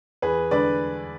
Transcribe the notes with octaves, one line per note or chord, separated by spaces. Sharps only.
E2 G#4 B4
D3 B4 D5